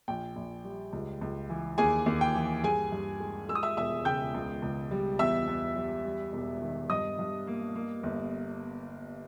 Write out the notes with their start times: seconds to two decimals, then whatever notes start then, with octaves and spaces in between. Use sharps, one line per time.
0.08 A#1 G5
0.36 A#1
0.64 G3
0.93 C#2
1.21 C#2
1.50 E3
1.78 D#2 G#4 G#5
2.06 D#2
2.21 G5
2.35 E3
2.63 G2 G#4 G#5
2.92 G2
3.20 G#3
3.49 G#3 E6
3.55 D#6
3.63 E5 E6
3.77 E1 E5 E6
4.05 C#3 G5 G6
4.34 C#2
4.62 C#2
4.91 G3
5.19 E2 E5 E6
5.47 E2
5.76 G3
6.05 G3
6.33 E1
6.61 D#3
6.90 G2 D#5 D#6
7.19 G2
7.47 A#3
7.75 A#3
8.03 G1